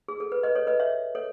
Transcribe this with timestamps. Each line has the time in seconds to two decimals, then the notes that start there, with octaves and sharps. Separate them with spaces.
0.08 G#4
0.20 A4
0.32 B4
0.43 B4 D#5
0.55 A4 C#5
0.67 B4 D#5
0.79 C#5 E5
1.15 A4 C#5